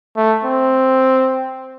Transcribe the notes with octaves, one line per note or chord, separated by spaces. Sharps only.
A3
C4